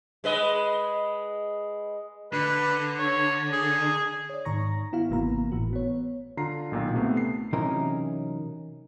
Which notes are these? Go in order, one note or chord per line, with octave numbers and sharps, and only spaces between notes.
G#3 B4 D#5
D3 B4
C#5
G#4
C#5 D5
G#2 D#3 A#5 C#6 A#6
B3 E4 F#4 F5
G#1 C3 E3 A#3 B3 A#5
G1 A2 E3 F#4
B3 C#5
D3 F4 A#5 C7
B1 A#2 D#3
C3 A3 B3
C7
C3 E3 F#3 C#4 D#4 A#4